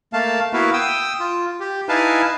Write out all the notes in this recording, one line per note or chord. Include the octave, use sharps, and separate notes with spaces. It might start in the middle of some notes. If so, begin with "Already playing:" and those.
A3 A#3 F5 A5
A#3 B3 E4 F#4 B4 F5
G5 D#6 E6
F4
G4
D#4 E4 B4 F5 G#5 A5